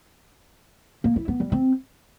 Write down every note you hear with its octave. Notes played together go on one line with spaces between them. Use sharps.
A#3
E4
B3
G3
C4